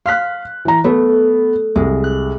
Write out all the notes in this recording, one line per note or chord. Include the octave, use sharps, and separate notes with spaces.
F5 C6 F6 F#6 B6
E3 A#5
A3 B3
C2 G#3
F#6